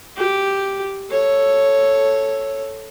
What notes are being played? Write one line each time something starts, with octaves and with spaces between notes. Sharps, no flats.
G4
A4 C#5